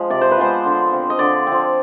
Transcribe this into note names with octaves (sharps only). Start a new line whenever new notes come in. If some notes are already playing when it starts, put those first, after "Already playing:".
Already playing: F3 G#3
C3 D5
C5
B4
F3 G#3 B3 C5
D3
F3 C4
D#5
D3 D5
F3 C4